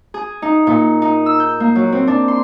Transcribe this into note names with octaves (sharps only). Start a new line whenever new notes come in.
G#4
D#4
A#2
D#4
E6
G6
A#3
F#3
C4
D4
C6